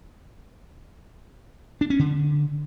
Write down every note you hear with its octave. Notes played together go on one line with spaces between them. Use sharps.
D4
C#4
D3